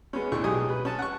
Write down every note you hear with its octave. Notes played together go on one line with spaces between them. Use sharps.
G#3 B3 C#4
D2 A2 C#6
B1 G#3 G4 G#5 D#6
B4
C#4 A5
F#5 C#6